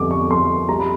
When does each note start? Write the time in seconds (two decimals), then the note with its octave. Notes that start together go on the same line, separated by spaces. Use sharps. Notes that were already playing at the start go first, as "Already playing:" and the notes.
Already playing: F2 D3 G3 D6
0.11 C#6
0.30 F2 C6
0.69 G3 A#5
0.80 B5